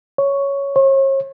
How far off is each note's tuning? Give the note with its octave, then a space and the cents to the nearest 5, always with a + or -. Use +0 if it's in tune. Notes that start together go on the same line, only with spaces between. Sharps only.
C#5 +5
C#5 -40